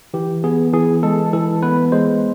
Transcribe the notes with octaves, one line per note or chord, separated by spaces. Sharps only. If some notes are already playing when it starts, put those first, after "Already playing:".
E3 G4
B3 G#4
E3 G#4
G#3 A4
E3 A4
B3 B4
G#3 C5